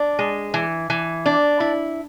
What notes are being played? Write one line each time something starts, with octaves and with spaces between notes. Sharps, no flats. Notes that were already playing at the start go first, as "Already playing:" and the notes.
Already playing: D4
G#3
E3
E3
D4
E4